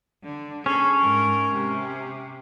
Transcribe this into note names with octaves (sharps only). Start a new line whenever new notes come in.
D3
C#4 G#4 A4
G#2 A#4
C3